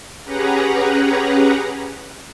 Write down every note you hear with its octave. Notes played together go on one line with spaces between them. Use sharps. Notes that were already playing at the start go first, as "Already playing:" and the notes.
C#4 G4 G#4 B4 F#5 A#5